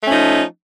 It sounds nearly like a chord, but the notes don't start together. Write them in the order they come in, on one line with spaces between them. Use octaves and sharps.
A3 C#4 F3 D#4